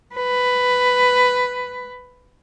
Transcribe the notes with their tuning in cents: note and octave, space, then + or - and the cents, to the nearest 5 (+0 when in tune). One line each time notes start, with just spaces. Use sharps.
B4 +10